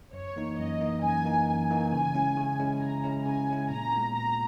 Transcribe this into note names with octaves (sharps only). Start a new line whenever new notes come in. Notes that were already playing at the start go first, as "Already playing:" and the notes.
F#2 C#5
E3 A#3 D#4
F#2 D#5
E3 A#3 D#4
F#2 G#5
E3 A#3 D#4
F#2 G#5
E3 A#3 D#4
C#3
G#3 C#4 E4
C#3
G#3 C#4 E4
C#3 A#5
G#3 C#4 E4
C#3 G#5
G#3 C#4 E4
A#2 A#5
G#3 B3
A#2 A#5